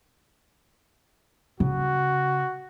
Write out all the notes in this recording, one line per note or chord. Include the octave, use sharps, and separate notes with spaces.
C#3 F#4